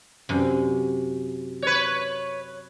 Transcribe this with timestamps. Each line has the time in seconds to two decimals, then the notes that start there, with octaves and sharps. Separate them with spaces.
0.29 F#2 C3
1.62 B4 C#5